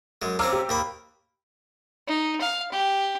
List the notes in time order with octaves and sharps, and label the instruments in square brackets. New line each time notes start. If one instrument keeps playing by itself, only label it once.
[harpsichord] F#2 G#3
[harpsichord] C4 C#4 F4 [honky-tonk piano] A#5 D6 E6
[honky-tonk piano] G4
[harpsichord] D#2 A#3 B5
[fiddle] D#4
F5
G4